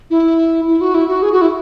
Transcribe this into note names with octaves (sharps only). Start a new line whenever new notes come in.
E4
E4
F#4
E4
F#4
G#4
F#4
E4